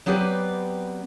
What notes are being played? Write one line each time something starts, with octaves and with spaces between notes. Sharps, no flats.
F#3 B3 C4 G4 B4 D5